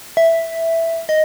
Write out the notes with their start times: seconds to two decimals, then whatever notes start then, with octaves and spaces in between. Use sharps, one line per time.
0.17 E5
1.09 D#5